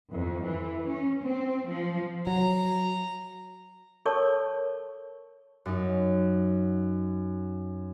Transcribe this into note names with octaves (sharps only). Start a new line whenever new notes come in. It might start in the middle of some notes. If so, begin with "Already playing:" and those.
F2
E3
C#4
C4
F3
F#3 A#5
A4 A#4 C#5 D5 A5 C#6
F#2 D#4